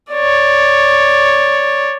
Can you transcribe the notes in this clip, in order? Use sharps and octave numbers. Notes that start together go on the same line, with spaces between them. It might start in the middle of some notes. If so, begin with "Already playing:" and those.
C#5 D5